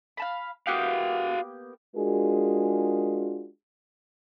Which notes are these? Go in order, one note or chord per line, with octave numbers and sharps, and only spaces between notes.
F5 A5 B5
A#3 B3 F#4 G4 F5
G#3 D4 F4 F#4 G#4 A#4